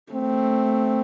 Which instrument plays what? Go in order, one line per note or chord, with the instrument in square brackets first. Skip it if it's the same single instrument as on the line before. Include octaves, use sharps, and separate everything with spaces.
[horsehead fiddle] A3 [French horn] C4